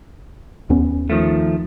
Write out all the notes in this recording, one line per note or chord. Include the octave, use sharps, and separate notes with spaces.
D#2 B3 C#4
D#3 F3 A3